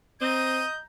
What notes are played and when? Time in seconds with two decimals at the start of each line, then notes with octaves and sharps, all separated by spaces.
0.21 C4 D#5 A#5 G6 D#7